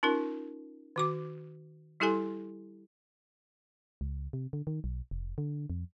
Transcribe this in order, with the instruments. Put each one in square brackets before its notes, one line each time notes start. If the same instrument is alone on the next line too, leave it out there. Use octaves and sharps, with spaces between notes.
[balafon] C#4 D#4 F4 A#4
D#3 F#4 D6
G3 E4 G4 A4 G#5 C6
[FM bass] C#2
C3
D3
D#3
B1
F1
D3
F2